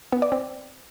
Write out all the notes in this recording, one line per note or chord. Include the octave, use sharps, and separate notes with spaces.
B3
D5
C4